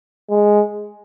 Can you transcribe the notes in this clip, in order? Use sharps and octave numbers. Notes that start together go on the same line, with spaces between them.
G#3